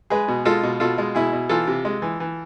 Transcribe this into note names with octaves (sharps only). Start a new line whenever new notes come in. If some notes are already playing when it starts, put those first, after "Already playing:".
G#3 G#4 B4
B2
G#3 F4 A4
B2
B2 F4 A4
G#3
B2 E4 G#4
B2
E3 F4 A4
C3
G#3
E3
E3